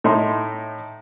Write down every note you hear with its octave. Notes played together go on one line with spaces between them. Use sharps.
A2 D#4 E5 C6